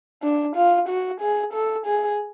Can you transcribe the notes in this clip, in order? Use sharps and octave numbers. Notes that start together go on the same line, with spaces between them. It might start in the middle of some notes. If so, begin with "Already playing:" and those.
D4
F4
F#4
G#4
A4
G#4